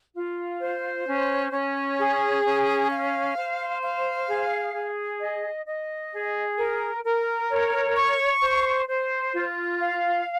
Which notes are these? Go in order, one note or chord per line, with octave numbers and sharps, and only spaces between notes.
F4
C5
C#4
C#4
G#4
C#4
F5
C5
F5
G#4
G#4
D#5
D#5
G#4
A#4
A#4
C#5
C#6
C5
C5
F4
F5